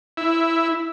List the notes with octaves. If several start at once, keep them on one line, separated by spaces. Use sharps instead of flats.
E4